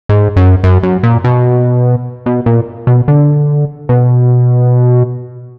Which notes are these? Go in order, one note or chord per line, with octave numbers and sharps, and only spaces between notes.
G#2
F#2
F#2
F#2
A#2
B2
B2
A#2
B2
D3
B2